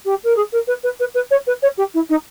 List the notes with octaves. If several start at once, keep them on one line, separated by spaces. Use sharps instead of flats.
G4
A#4
G#4
A#4
B4
B4
B4
B4
C#5
B4
C#5
G4
E4
D#4